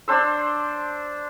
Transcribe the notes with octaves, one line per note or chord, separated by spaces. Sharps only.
D4 C5 E6